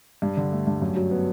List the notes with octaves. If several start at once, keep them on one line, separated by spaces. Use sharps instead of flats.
G2
D3
A3
G2
F#2
F#3
B3